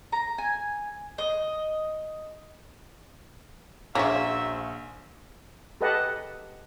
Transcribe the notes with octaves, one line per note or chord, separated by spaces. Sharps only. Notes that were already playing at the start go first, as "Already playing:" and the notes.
A#5
G#5
D#5
A#1 C#3 A#3 F#4 C5 C#5 E5
G4 A4 B4 D#5 F#5 A5